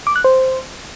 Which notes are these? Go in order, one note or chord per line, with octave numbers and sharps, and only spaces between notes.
D6
F#6
C5